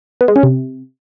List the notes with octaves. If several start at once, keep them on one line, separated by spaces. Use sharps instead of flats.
B3
G#3
C#4
C3